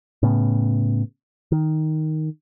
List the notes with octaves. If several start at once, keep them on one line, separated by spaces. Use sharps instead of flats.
A2 C#3 B3
D#3